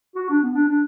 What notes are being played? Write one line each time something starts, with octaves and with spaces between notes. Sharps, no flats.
F#4
D4
B3
D4
D4